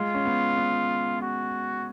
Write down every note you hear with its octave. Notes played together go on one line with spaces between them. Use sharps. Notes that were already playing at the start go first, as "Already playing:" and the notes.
Already playing: G#3 F4
C#4
B3
B3
F#4